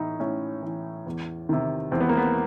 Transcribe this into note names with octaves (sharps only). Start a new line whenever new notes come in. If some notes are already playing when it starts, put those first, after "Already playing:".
Already playing: A2 E3 D#4 E4
A2 C#4
E3
E2
C3 D#3
E2 C4
B3
A#3
B3